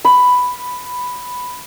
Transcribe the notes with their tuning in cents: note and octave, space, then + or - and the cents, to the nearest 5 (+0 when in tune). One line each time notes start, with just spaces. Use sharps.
B5 +5